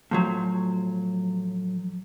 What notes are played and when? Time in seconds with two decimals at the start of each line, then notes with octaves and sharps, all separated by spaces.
0.11 A2 F3 F#3